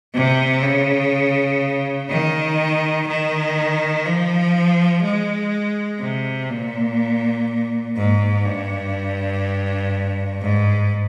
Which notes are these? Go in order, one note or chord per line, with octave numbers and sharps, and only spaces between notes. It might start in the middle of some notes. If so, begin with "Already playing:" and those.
C3
C#3
D#3
D#3
F3
G#3
C3
A#2
G#2
G2
G#2